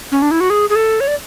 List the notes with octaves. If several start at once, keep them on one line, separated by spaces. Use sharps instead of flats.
C#4
D4
E4
F#4
G#4
G#4
A4
C#5
D5